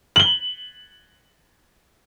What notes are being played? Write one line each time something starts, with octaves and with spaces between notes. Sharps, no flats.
F#7 G7